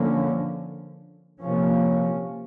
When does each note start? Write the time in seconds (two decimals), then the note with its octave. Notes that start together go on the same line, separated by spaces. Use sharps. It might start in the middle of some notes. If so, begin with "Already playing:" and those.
Already playing: D3 F3 A#3 C#4
1.42 C3 F3 A#3 C#4